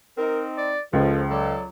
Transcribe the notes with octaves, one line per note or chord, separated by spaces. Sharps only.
C4 D#4 A#4
D5
C#2 F3 A4
F#3 A4 D5